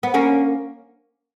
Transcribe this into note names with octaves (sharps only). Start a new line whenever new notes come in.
B3
A#3 C#4